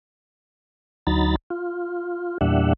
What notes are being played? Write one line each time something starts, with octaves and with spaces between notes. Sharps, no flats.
D2 F#3 D#4 A#5 B5 A6
F4
E2 A#2 G3 D4 E5 F#5